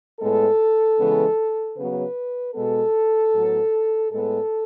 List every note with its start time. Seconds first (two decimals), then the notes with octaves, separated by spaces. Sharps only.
0.20 A2 G#3 B3 A4
0.99 C#3 E3 G#3 B3
1.76 C#3 F#3 B3 B4
2.54 B2 G#3 B3 A4
3.33 A2 F#3 B3
4.11 A2 G#3 B3 A4